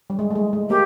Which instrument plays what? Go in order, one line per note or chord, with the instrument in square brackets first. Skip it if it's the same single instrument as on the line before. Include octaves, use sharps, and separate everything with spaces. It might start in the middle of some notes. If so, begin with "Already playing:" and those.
[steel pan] G3
G#3
A3
G#3
G#3
[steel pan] A#3 [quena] G4